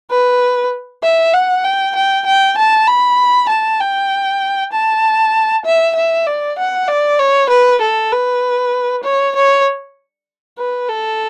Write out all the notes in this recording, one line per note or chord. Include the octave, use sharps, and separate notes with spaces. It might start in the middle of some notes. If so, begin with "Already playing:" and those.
B4
E5
F#5
G5
G5
G5
A5
B5
A5
G5
A5
E5
E5
D5
F#5
D5
C#5
B4
A4
B4
C#5
C#5
B4
A4